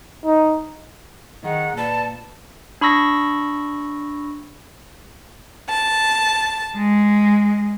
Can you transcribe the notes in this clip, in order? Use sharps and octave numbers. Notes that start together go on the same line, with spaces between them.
D#4
D#3 G#4 F#5
A#2 B4 D5 A5 B5
D4 B5 C#6 E6 A#6
A5
G#3